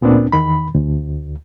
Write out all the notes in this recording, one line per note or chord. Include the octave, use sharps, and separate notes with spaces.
D2 A#2 B3 C4 D4
E2 D#3 B5
D2